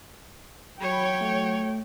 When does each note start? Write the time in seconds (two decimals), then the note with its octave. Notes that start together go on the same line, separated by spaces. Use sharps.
0.81 F#3 C#5 G5 B5
1.21 A3